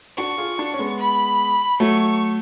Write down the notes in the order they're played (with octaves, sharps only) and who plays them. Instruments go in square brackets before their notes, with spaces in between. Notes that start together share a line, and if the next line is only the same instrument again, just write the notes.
[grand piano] D4 F#4 [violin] C#6
[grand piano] F4 G#4
D4 F#4
C#4
G#3 B3
[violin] B5
[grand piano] F#3 A3 [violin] C#6